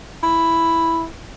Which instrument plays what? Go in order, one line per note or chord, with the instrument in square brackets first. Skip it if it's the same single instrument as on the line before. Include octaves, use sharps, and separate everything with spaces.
[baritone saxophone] E4